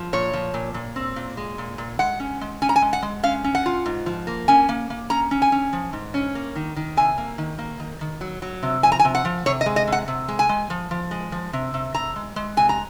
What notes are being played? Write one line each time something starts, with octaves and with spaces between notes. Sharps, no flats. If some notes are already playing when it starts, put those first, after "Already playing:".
Already playing: F3
A#2 C#5
F3
A#2
A#2
C4
A#2
G#3
A#2
A#2
G#3 F#5
C#4
G#3
C#4 G#5
A#5
G#5
G#3
F#5
G#3
C#4 F5
C#4
F#5
F4
G#2
F3
A#3
C#4 G#5
A#3
A#3
C#4 A#5
C#4
G#5
C#4
F3
G#2
C#4
A#3
D#3
D#3
C3 G#5
A#3
D#3
A#3
D#3
D#3
F#3
F#3
C3
F3 G#5
A#5
G#5
C3
F#5
F3
C3 C#5
D#5
G#3
D#5
C3
F#5
C3
G#3
G#5
G#3
F3
F3
G#3
F3
C3
C3
C3 A#5
G#3
G#3
C3 G#5
A#5